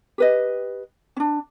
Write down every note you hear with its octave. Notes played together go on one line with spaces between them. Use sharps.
G4 B4 D#5
C#4 D4